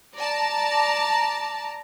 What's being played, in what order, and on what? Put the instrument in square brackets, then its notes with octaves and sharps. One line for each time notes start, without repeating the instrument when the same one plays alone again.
[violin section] D5 A5 [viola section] A#5